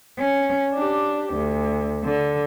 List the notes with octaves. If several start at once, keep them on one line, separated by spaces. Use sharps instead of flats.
C#4
D4 G4
D2
D3